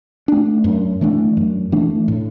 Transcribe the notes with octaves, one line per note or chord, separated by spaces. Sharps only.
A3 D4
F#2
E3 A3 D4
F#2
E3 A3 D4
A2